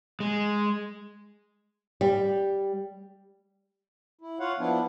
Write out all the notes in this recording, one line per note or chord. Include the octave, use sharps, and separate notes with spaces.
G#3
G3
E4
F4 C#5 F5 F#5
F3 B3 D4 E4